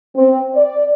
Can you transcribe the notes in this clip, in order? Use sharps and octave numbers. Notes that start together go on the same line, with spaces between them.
C4
D5